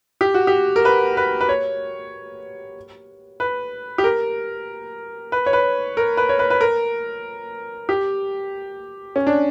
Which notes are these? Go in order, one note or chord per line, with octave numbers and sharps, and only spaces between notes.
G4
F#4
G4
A#4
B4
B4
B4
C#5
B4
G4
A#4
B4
C#5
B4
A#4
B4
C#5
B4
B4
A#4
G4
C#4
D4